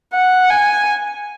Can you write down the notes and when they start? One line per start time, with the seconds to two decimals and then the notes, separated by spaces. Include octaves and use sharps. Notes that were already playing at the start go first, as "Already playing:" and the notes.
0.14 F#5
0.50 G#5